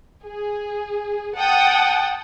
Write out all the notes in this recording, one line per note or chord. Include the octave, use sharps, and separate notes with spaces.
G#4
F#5 G5 A5 D#6